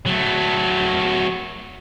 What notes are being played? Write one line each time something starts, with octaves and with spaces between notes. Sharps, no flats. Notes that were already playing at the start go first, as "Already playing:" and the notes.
F#3 A3